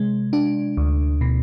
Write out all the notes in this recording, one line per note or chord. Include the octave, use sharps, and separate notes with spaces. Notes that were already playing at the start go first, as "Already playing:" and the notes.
Already playing: C3 G#3
D4
D2
B2